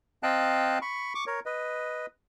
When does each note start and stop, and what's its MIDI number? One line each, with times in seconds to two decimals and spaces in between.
0.23 0.79 60
0.23 0.79 75
0.23 0.79 77
0.23 0.79 79
0.23 0.79 81
0.23 0.79 90
0.82 1.13 83
0.82 1.13 85
1.15 1.24 85
1.15 1.24 86
1.27 1.40 70
1.27 1.40 73
1.46 2.06 71
1.46 2.06 75